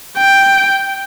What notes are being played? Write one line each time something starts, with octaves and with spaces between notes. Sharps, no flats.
G5